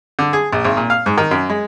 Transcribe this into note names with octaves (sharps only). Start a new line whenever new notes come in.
D3
G#4
A#1
G#1
A#2
F5
G#2
D#3
F#2
G#3